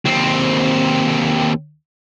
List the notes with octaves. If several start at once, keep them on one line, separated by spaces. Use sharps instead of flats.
D#2 C4